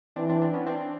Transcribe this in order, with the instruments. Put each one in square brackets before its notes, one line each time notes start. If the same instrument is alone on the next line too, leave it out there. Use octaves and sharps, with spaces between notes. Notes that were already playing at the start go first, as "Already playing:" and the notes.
[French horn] E3 [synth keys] C4 D4
[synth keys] C4 D4
C4 D4
B3 C#4
C4 D4